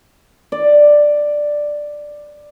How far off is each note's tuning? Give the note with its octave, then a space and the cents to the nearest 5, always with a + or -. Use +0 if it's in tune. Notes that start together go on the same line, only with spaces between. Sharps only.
D5 +5